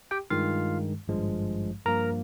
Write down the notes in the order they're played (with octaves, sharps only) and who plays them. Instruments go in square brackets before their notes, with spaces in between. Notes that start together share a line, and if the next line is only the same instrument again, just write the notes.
[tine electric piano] G4 G5
G2 D#3 G#3 F4 F5
G#1 G2 F3 G#3
G2 F3 A#3 A#4 A#5